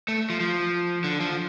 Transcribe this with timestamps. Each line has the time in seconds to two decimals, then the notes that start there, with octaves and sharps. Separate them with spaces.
0.08 A3
0.30 F3
0.40 F3
1.04 D3
1.20 F3